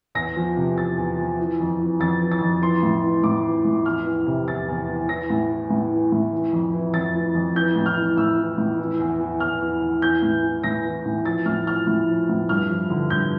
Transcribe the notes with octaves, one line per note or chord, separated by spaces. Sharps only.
E2 A#6
F3
C3
E2 A6
E2
F3
E3
F2
E3
F2 A6
E3
A6
F2
E3 C6
A2
E3
A2 D6
E3
A2
E2 F6
E3
C3
E2 A6
E2
E3
E3 A#6
A2
E3
A2
E3
A2
E3
F2
E3
F2 A6
E3
F2
E3 G6
A2
F6
E3
A2 E6
E3
A2
E3
E2
E3
E2 F6
E3
E2
E3 G6
A2
E3
A2 A#6
E3
A2
F3 A6
A2 F6
F3 F6
A2
F3
A2
G2 F6
F3
D3
G2 G6